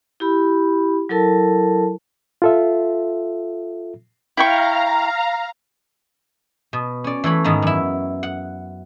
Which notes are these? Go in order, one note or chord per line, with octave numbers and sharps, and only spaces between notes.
E4 G4 B5
F#3 E4 A4 A#4 A5
F4 A4 E5
E4 F5 G5 A#5 C#6
B2
C#4 D5
E3 A3 C#5 B5
G#2 D#3 B3 A#5
F#2 E4
F#5